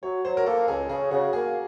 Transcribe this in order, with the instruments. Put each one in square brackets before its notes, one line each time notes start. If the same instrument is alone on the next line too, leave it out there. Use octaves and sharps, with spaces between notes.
[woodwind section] F#3 [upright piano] C#5
[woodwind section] F#3 [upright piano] C5
[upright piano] A#4
[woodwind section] A#3 [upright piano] A4
[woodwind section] C#2 [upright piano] G#4
[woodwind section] C#3 [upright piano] G#4
[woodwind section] C#3 [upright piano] F#4
[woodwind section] A#3 [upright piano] G#4